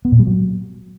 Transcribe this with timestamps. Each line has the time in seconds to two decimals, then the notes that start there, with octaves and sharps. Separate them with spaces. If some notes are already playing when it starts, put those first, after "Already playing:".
0.05 B3
0.12 A#2
0.19 G3
0.27 F#3